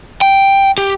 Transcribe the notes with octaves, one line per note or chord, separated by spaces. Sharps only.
G5
G4